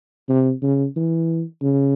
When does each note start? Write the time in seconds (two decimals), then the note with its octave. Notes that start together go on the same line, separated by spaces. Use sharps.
0.29 C3
0.62 C#3
0.97 E3
1.63 C#3